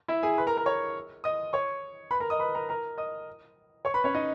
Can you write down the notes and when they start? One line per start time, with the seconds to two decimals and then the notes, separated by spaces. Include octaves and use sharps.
0.08 E4 E5
0.23 G#4 G#5
0.38 B4 B5
0.47 A#4 A#5
0.57 A#4 A#5
0.66 C#5 C#6
1.24 D#5 D#6
1.53 C#5 C#6
2.11 B4 B5
2.20 A#4 A#5
2.30 D#5 D#6
2.40 B4 B5
2.55 A#4 A#5
2.69 A#4 A#5
2.98 D#5 D#6
3.85 C#5 C#6
3.94 B4 B5
4.04 C#4 C#5
4.14 D#4 D#5